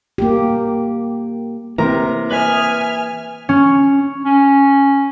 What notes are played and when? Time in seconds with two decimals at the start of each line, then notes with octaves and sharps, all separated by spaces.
0.18 A#3 G4
1.78 C3 E3 A#3 A#4 A#5
2.31 B4 E5 G#5 D#6 F6
3.49 C#4
4.25 C#4